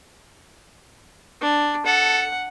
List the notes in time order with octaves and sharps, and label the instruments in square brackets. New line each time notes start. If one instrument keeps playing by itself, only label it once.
[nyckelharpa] D4
[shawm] A4 [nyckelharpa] F#5